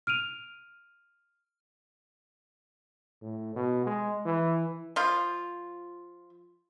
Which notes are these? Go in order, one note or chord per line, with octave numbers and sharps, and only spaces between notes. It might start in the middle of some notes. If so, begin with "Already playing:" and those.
F6 D7 D#7 F7
A2
B2
G#3
E3
F3 F4